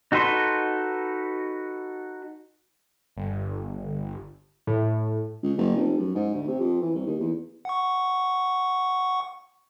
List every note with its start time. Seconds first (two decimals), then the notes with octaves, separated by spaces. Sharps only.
0.12 D#4 F#4 A4 B4 C6
3.17 G1
4.67 A2
5.43 C#2
5.57 F#1
5.76 F1
5.98 F#2
6.15 G#2
6.34 D2
6.47 C3
6.60 F2
6.81 E3
6.94 C2
7.06 D#2
7.20 E2
7.65 F#5 C#6